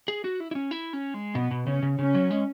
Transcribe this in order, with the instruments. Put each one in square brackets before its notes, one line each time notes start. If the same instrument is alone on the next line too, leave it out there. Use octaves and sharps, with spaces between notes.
[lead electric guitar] G#4
F#4
E4
E4
C#4
E4
C#4
G#3
[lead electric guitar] B2 [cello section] B3
[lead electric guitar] B2
[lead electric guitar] C#3 [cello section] C#4
[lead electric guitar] C#3
[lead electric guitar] C#3 [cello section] C#4
[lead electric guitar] F#3
G#3